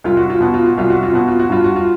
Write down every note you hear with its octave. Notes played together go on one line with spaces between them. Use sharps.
C2 F4
F#4
F4
B2 F#4
F4
F#4
C2 F4
F#4
F4
B2 F#4
F4
F#4
G2 F4
F#4
F4